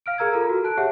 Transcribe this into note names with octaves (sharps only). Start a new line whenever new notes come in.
F5 F6 D7
G#4 A#4 A#5 E6 G#6
F4 A4 A#5
F#4
A5 F#6 D7
G4 G#4 C#5 E5 F#5